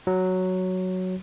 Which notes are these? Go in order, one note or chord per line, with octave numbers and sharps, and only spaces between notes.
F#3